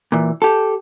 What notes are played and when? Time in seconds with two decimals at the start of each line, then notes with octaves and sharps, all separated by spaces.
0.12 A#2 E3
0.42 G4 A4